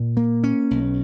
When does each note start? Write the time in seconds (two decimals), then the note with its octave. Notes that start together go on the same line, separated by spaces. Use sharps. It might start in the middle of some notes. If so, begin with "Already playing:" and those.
Already playing: A#2
0.17 A#3
0.44 C#4
0.71 B1